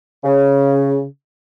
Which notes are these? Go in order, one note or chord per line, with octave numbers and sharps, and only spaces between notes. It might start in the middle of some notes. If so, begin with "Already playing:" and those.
C#3